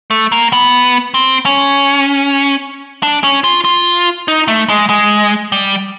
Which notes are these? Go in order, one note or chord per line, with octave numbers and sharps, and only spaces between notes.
A3
A#3
B3
C4
C#4
D4
C#4
F4
F4
D#4
A3
G#3
G#3
G3